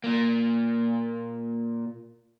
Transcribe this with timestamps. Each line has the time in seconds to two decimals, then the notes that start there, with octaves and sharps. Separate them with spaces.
0.04 A#2 A#3